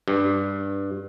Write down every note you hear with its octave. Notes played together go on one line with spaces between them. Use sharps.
G2